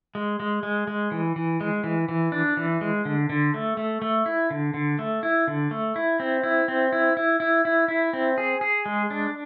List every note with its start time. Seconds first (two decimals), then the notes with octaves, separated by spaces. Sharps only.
0.15 G#3
0.40 G#3
0.63 G#3
0.87 G#3
1.11 E3
1.36 E3
1.61 G#3
1.84 E3
2.09 E3
2.32 D4
2.57 E3
2.81 G#3
3.05 D3
3.30 D3
3.54 A3
3.77 A3
4.02 A3
4.26 E4
4.51 D3
4.74 D3
4.99 A3
5.23 E4
5.48 D3
5.71 A3
5.96 E4
6.20 C4
6.43 E4
6.68 C4
6.93 E4
7.17 E4
7.40 E4
7.65 E4
7.88 E4
8.13 C4
8.38 G#4
8.61 G#4
8.86 G#3
9.10 D4